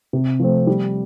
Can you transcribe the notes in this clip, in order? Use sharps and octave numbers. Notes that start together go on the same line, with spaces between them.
C3
F3 A3 C4
G3